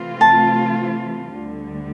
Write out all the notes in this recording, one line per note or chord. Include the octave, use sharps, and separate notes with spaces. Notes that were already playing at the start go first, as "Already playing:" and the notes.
Already playing: C3 E3 A3 C4 F4
A5
D2 D3 G3